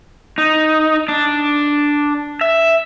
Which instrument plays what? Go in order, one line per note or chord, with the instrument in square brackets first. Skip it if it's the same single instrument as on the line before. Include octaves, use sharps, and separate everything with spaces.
[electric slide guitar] D#4
D4
E5